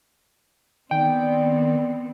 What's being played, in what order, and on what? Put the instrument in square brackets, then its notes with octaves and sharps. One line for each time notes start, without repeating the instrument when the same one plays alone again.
[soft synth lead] D#3 [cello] B3 C4 [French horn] D5 [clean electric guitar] G5